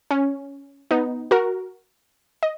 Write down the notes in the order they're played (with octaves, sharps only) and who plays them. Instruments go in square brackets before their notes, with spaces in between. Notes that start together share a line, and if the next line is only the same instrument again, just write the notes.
[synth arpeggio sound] C#4
B3 D#4
F#4 A#4
D#5